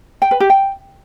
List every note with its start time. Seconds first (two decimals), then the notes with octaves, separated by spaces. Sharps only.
0.22 G5
0.31 B4
0.40 G4
0.50 G5